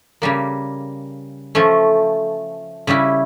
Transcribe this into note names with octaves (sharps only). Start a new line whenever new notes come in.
C#3 G3 A#3
F3 A3 C#4
C#3 G3 C#4 E4